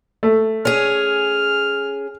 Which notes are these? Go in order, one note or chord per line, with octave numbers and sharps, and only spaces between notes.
A3
C#4 G#4 F6